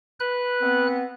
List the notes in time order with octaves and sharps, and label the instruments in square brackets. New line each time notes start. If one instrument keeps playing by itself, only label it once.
[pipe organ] B4 F#6
[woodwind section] B3 C4